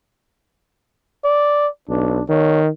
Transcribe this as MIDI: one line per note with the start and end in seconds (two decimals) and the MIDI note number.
1.24 1.68 74
1.89 2.19 35
1.89 2.23 62
2.29 2.68 51
2.29 2.61 73